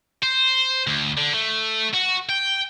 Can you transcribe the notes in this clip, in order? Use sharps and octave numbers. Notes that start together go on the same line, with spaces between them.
C5
D2
D3
A3
F#4
G5